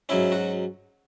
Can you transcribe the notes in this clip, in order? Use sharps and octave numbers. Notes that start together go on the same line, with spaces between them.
G#2 F#3 C#4 E4
F#4